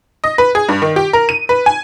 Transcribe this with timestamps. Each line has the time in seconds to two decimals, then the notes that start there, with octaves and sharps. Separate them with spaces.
0.24 D#5
0.38 B4
0.55 G#4
0.69 G2
0.82 D#3
0.96 G4
1.13 A#4
1.29 D#7
1.49 B4
1.66 G#5